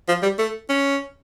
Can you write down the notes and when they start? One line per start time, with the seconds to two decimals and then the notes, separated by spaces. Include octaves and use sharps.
0.09 F3
0.23 G3
0.39 A3
0.69 C#4